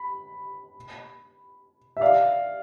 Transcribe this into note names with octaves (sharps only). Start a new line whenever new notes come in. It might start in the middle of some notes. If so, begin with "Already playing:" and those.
Already playing: B5
E5
D5 F5